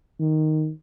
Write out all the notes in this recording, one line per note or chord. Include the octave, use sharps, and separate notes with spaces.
D#3